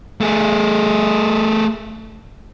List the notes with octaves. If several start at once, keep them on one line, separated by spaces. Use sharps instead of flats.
A3 G#4